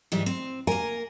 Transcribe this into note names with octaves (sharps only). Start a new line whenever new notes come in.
G#2 E3 G3
C4
A#3 A#4 G#5